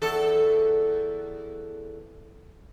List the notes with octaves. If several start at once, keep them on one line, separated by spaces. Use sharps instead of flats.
E2 A4